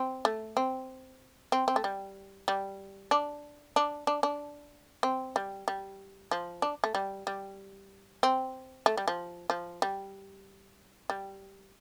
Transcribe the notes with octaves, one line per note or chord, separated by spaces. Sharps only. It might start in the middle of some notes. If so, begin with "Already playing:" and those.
Already playing: C4
A3
C4
C4
C4
A3
G3
G3
D4
D4
D4
D4
C4
G3
G3
F3
D4
A3
G3
G3
C4
A3
G3
F3
F3
G3
G3